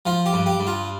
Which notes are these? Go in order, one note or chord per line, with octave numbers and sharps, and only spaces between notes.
F3 F4
G4
G2
G4
G2
F4